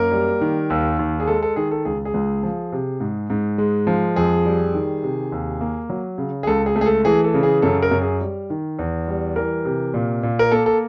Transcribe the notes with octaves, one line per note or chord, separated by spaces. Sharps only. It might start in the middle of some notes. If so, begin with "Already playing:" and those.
Already playing: F#2 A#3 A#4
G3
D#3
D#2
D#2
G#4
G#3 A4
A4
D#3 G#4
A4
C#2 G#4
G#4
C#2
F3
C3
G#2
G#2
G#3
F3
F2 G#4
G3
D#3
C3
D#2
A#3
F#3
C#3
G#4
C#2 A4
G#4
A3
G#4
A4
E3 G#4
A4
C#3
G#4
F#2 A4
A#4
F#2
G#4
G3
D#3
E2
G3
E3 A#4
C3
A#2
A#2
A#4
A#3 A4
A4